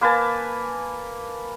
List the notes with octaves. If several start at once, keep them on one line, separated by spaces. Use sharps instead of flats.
A#3 B4 G#5 A5